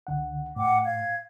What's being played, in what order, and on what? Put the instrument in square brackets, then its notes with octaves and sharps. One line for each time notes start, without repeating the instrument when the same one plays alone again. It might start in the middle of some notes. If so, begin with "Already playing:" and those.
[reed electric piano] C#2 D3 F#5
[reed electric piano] A2 [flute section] F#5 G5 D6
[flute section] F5 G#6